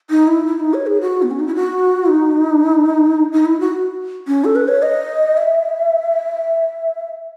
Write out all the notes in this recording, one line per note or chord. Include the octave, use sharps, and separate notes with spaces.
D#4
E4
E4
D#4
C#5
G#4
F#4
B3
C#4
D#4
E4
F#4
D#4
D#4
E4
F#4
C#4
A4
B4
C#5
D#5
E5